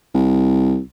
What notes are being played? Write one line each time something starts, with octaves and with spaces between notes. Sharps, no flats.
C2